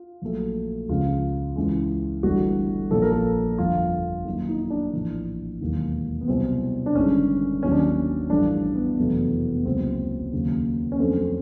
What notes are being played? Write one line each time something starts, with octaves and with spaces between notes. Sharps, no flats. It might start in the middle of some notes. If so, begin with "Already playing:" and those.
Already playing: F4
A#1 A#2 F#3 A3
C#2 C#3 F3 F4
C#2 C#3 E3 G#3
G1 G2 E3 A3 F#4
A#1 A#2 F3 A4
A#4
A4
G1 F2 D3 F3 F4
F#2 D#3 F#3 A#3
D#4
D4
A#1 A2 E3
E1 D#2 D#3 F#3 A#3
B3
C2 B2 F#3 C4
D4
G1 G2 D#3 G#3 C#4
D#2 D#3 F#3 C#4
D4
C#4
A1 G2 D3 F3 D4
B3
F1 E2 B2 F#3 A3
B3
C#2 C#3 F#3 A#3 C4
D#2 C#3 F#3 A#3
C#4
F2 D3 F#3 A3 C4